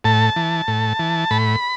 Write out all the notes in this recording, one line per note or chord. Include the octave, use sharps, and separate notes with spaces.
A2 A5
E3
A2
E3
A2 B5